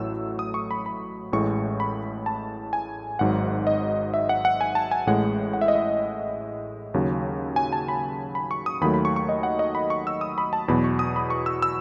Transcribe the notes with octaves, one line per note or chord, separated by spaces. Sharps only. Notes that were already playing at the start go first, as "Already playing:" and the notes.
Already playing: A1 A2 F#3 A3 E6
D#6
C#6
B5
B5
A1 A2 G#3 C#6
B5
A5
G#5
G#1 G#2 F#3 F#5
D#5
E5
F#5
F#5
G#5
A5
G#5
A1 A2 G#3 F#5
F#5
E5
D#5
E5
D#2 C#3 F#3
G#5
A5
B5
B5
C#6
D#6
D#2 D#3 F#3 A3 B5
B5
C#6
C#6
D#5
F#5
D#5
B5
C#6
E6
D#6
B5
A5
E2 B2 F#3 B5
C#6
D#6
B5
C#6
E6
E6